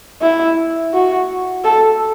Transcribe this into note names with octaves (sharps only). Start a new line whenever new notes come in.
E4
F#4
A4